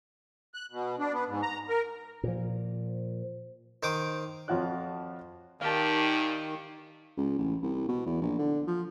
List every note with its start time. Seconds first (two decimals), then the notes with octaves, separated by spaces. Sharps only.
0.54 F#6
0.72 B2
0.99 D4
1.13 B3
1.27 G#2
1.42 A#5
1.69 A#4
2.23 A#2 F3
3.83 D#3 C5 D6 D#6
4.48 F2 F3 F4 F#4 C#5 F#6
5.61 A#2 D#3 G4 F5 A5
7.17 C#2
7.38 A1
7.62 C2
7.88 B2
8.06 E2
8.21 A#1
8.38 D3
8.67 F3